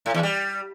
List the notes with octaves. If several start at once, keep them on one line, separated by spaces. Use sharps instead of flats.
A2
E2
G3